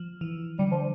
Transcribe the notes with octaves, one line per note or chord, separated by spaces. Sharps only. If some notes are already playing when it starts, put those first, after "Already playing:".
Already playing: F3
E3
D3 G3
F3